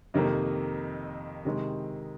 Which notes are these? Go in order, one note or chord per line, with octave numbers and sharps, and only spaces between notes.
F2 C3 D#3 A#3
C3 D#3 G#3